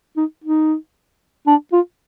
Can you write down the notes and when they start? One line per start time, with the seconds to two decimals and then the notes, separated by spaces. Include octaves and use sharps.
0.17 D#4
0.44 D#4
1.47 D4
1.73 F4